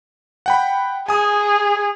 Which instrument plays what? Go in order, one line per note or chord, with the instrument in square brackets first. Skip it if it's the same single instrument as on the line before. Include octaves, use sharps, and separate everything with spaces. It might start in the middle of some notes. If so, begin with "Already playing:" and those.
[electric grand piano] F#5 G5 B5
[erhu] G#4 [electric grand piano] G#5 D#6